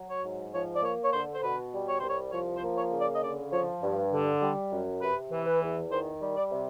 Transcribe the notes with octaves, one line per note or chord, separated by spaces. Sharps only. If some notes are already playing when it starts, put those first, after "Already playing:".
Already playing: F#3
C#5
G#2
F3 C#5
D5
A#3 C#5
C#5
D3 C5
C5
B2 B4
G3
C#5
C2 C5
C#5
F3 C#5
C5
A#3
C#5
C#3
D5
D#5
D3 D5
F3 C#5
G2
D3
G3
F#2
C3 B4
E3
B4
E2
D#3 C5
G3
D5
C3